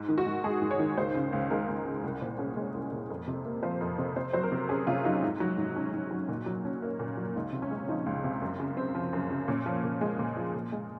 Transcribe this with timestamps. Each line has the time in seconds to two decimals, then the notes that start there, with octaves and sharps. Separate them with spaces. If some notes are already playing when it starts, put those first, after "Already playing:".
Already playing: G#2
0.09 D#3
0.18 F#4
0.26 G#2
0.44 G#3 G#4
0.61 G#2
0.71 C#5
0.79 D#3
0.97 C#2 C5
1.15 C#3
1.33 C#2
1.50 G#3 A#4
1.68 C#2
1.86 C#3
2.03 C2
2.21 A#2 C5
2.39 C#4 G#4
2.57 G#3
2.74 C2
2.92 A#2
3.10 F2
3.28 C3
3.45 A#3
3.63 F3 C5
3.81 F2
3.99 C3
4.16 C3 C5
4.33 F#3 C5
4.43 A#4
4.52 C3
4.69 C#4 G#4
4.87 C3 F4
5.05 F#3 D#4
5.22 G#2
5.40 F#3
5.58 G#2
5.76 C#4
5.94 G#2
6.11 F#3
6.29 A#2 D#4
6.46 F#3
6.65 C#4
6.82 A#3
6.99 A#2
7.17 F#3
7.35 C#2 D#4
7.53 C3
7.62 C#4
7.71 G#3
7.88 F3 D#4
8.06 C#2
8.24 C3
8.41 F#2
8.60 C#3
8.77 C4
8.95 F3
9.13 F#2
9.30 C#3
9.48 A#2 C#4
9.66 F3
9.84 A#2
10.01 G#3
10.19 A#2
10.37 F3
10.54 A#2
10.72 G#3